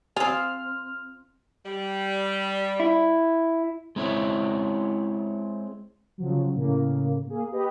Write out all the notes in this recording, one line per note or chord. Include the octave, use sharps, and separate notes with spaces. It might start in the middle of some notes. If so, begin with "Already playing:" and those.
C4 F4 G#4 F6
G3
E4
G#3 C4 E4 C#5 E5
C#3 F3 F#3
A2 C#3 A#3
A#3 G#4
G4 B4 D#5